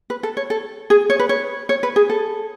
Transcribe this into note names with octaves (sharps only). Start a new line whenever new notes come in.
B4
A4
C#5
A4
G#4
C#5
B4
C#5
C#5
B4
G#4
A4